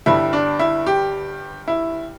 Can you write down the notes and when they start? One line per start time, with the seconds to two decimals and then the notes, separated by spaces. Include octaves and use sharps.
0.06 G1 G2 G3 E4
0.33 D4
0.59 E4
0.87 G4
1.68 E4